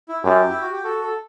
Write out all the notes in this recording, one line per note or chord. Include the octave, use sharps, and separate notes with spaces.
E4
F#2 G4
E4
F#4
G4
F#4 A4
A4